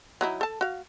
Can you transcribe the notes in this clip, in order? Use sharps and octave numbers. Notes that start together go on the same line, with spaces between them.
F#3 D#4 E4
A4 A5
F#4 F5